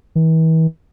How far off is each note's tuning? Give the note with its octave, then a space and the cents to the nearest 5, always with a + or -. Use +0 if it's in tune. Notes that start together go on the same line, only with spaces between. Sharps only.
E3 -40